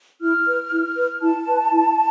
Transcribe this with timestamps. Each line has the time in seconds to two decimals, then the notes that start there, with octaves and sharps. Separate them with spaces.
0.21 E4 F6
0.46 B4
0.72 E4
0.96 B4
1.21 E4 A5
1.46 B4
1.72 E4